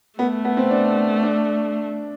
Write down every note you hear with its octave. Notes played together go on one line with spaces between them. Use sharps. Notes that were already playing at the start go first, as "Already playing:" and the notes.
A3 B3
B3
C4
D4
D4